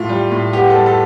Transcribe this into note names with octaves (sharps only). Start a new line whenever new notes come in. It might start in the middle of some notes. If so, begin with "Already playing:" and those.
Already playing: A2 F4
G3
A2
B3 G4
G3 A4
A4